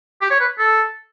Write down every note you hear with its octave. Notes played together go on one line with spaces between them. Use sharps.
G4
C#5
B4
A4